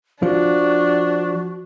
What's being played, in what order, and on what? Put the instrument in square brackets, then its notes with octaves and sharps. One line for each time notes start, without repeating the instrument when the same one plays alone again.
[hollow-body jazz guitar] F3 [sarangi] D4 [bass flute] F#4